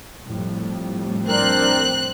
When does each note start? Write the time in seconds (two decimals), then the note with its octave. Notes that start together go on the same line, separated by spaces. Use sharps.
0.25 F2 A2 G3
1.27 C4 D4 A#4 F#6